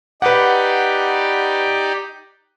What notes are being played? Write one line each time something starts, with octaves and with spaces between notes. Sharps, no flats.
D#4 G4 B4 D5 F#5